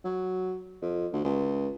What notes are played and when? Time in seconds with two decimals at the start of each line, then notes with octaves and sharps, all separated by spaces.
0.04 F#3
0.82 F2
1.13 D2
1.24 C#2